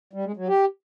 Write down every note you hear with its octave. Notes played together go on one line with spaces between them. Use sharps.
G3
G#3
F#3
G4